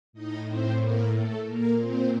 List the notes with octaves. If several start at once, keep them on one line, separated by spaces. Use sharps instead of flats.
A2 D#4 D#5
C4 C5
A#3 A#4
A3 A4
A#2 A#3 A#4
C4 C5